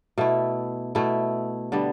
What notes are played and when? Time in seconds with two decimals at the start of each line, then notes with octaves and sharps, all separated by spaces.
0.18 B2 A3 E4
0.95 B2 A3 E4
1.72 D3 G3 B3